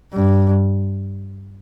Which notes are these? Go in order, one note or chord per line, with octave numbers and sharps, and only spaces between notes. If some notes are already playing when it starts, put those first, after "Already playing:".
G2